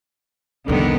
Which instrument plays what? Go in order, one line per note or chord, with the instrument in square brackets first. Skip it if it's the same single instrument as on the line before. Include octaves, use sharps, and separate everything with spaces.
[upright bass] C2 F2 [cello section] D3 D#3 B3